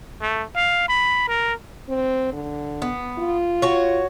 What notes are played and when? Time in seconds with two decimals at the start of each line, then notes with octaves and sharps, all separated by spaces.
0.22 A3
0.56 F5
0.89 B5
1.28 A#4
1.89 C4
2.33 D3
2.82 B3
3.19 F4
3.62 F#4 C#5